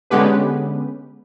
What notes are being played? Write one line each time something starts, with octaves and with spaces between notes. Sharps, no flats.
D3 G#3 B3 C#4 G4 B4